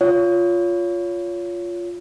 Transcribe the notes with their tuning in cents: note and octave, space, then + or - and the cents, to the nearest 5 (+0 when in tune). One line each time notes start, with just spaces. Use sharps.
F4 +0 C#5 +20